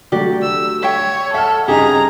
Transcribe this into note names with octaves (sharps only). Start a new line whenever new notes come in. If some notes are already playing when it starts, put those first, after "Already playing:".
D3 F#3 A3 F#4 G4 D5
E6
C#5 E5 G5
A4 E5 F#5 F6
G2 C#3 D#4 G4 G#4 A#5